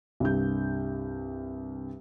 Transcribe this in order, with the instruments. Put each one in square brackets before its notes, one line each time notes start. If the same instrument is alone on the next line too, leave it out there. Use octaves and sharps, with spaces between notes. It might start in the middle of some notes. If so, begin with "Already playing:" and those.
[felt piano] C2 G2 G6